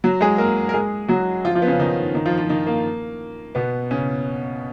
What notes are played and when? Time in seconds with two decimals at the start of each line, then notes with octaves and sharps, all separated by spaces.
0.04 F#3 F#4
0.21 G#3 G#4
0.38 A#3 A#4
0.69 A#4
0.74 G#3 G#4
1.08 F#3 F#4
1.45 F3 F4
1.55 F3 F4
1.62 B3
1.67 C#3 C#4
1.80 D#3 D#4
2.15 D#3 D#4
2.26 F3 F4
2.38 F3 F4
2.49 D#3 D#4
2.67 A#3
3.55 B2 B3
3.91 C#3 C#4